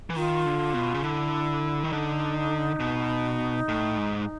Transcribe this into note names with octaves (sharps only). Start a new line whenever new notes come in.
E3
D#3 F4
D3
B2
C#3
D3 E4
D#3
D3 D#4
B2
A2
G#2